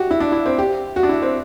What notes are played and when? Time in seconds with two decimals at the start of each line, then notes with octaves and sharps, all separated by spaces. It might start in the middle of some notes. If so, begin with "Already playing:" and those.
Already playing: F#4 G4
0.11 E4
0.20 D4
0.32 E4
0.46 C4
0.58 G4
0.96 F#4
1.03 D4
1.09 E4
1.22 C4